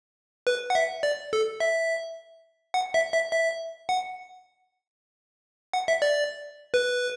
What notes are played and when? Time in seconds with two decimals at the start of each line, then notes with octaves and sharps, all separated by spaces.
0.47 B4
0.70 F#5
0.75 E5
1.03 D5
1.33 A4
1.60 E5
2.74 F#5
2.94 E5
3.13 E5
3.32 E5
3.89 F#5
5.73 F#5
5.88 E5
6.02 D5
6.74 B4